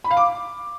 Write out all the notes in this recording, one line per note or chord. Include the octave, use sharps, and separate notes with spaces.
B5
F5
D6